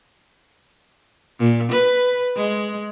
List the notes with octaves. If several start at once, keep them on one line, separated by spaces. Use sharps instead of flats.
A#2
B4
G#3